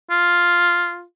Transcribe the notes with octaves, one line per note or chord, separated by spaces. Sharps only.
F4